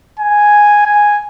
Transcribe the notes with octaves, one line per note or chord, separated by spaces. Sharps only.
G#5
G#5